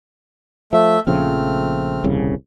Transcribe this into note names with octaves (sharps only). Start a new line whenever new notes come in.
F3 A3 E5
A#1 C#3 F3 A3 C4 F6
D#1 C2 C#3